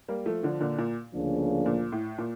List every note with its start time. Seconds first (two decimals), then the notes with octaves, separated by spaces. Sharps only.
0.08 G3 A#3
0.26 F3 A3
0.43 D3 F3
0.60 A#2 D3
0.78 A#2
1.14 D2 C#3 F3 A#3 D4
1.66 A#2
1.92 A2
2.18 A#2